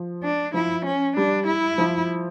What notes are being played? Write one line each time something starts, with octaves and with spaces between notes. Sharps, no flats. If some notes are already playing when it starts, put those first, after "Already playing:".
Already playing: F3
D4
F3 E4
C#4
G3 D4
E4
F3